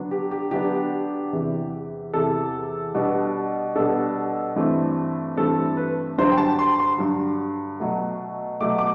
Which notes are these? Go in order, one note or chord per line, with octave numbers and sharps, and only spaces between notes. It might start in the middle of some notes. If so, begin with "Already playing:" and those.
Already playing: D3 F#3 B3 D4
G4
G4
D3 F#3 B3 D4 G4
E2 C3 E3
E2 C3 E3 A4
B2 G3 B3 D4
B2 G3 B3 D4 A4
G2 E3 A3 C4
G2 E3 A3 C4 A4
B4
G2 D3 F#3 C5
G5
A5
C6
C6
G2 D3 F#3
B2 F#3 A3
B2 F#3 A3 D6
D6